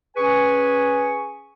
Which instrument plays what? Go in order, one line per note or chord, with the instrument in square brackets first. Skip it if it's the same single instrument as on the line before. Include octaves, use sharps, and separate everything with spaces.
[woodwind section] C#4 G#4 B4 G#5 C#6